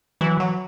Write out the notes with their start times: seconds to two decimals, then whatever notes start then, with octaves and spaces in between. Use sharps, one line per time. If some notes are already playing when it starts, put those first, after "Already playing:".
0.21 E3 F#3
0.40 F#3